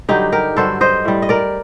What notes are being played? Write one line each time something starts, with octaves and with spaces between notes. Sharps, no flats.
G2 D3 F#3 D#4 G4
G4 A#4
G2 D3 F#3 A4 C5
C5 D#5
A2 G3
D#5
A#4 D5